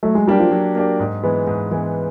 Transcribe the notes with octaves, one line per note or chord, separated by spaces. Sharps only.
F#3 A3
G#3
G3 A#3 D4 G4
F3
F#3
A#3 D4 G4
G#2
E3 G#3 B3
G#2
E3 G#3 B3